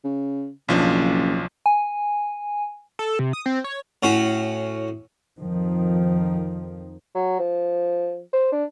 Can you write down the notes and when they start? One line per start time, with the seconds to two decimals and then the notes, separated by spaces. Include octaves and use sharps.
0.04 C#3
0.68 F#1 B1 F3 D4
1.66 G#5
2.99 A4
3.19 C3
3.33 D#6
3.46 C4
3.64 C#5
4.03 A2 C#4 F#4
5.38 F2 D#3 F3
7.15 F#3
7.39 F3
8.33 C5
8.52 D4